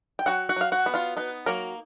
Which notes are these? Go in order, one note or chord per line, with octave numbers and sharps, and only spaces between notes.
G5
F#3 F#4 F#5
F#4 F#5
F#3 F5
F#4 F#5
B3
F4 F5
B3 D#4 B4
F#3 A#3 A#4